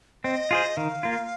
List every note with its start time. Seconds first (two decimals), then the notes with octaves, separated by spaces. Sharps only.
0.24 C4 D#5
0.51 F4 G#4 C5
0.77 D#3 F5
1.03 A#3 F4